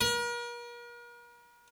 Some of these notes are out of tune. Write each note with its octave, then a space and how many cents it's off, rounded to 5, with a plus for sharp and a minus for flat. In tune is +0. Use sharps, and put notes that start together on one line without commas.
A#4 +40